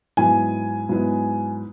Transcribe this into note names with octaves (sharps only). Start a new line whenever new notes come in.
G#2 F#3 B3 E4 G#5
G#2 F#3 B3 E4